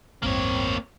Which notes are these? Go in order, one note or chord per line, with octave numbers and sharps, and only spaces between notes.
A1 E2 G2 A#3 C4 C#5